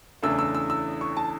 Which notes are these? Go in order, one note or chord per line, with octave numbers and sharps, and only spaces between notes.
E2 C#3 E3 A3 D4 E6
E6
E6
E6
C#6
A5